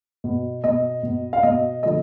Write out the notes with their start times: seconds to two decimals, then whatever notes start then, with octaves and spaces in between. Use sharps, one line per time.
0.24 B2
0.64 B2 D#5
1.03 B2
1.33 F5
1.43 B2 D#5
1.83 D3 F3 D#5